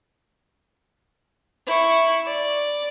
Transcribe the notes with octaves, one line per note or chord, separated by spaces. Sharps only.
E4 C#6
D5